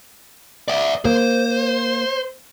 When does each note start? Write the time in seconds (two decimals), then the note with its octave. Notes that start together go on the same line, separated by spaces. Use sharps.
0.68 D5 E5
1.05 A#3 C5